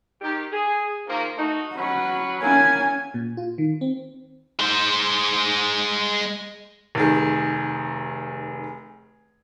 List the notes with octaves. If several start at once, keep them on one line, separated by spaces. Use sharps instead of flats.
D#3 G4
G#4
D#3 F3 A#3
A3 D#4 F#4
F#3 C#4 F#4 B4
F#3 A#3 C#4 E4 G#5
A#2
F4
D#3
C4
G#3 C5
F1 D#3 G#4